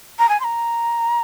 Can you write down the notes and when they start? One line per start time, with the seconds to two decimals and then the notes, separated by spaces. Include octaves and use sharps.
0.19 A#5
0.29 G#5
0.40 C6
0.44 A#5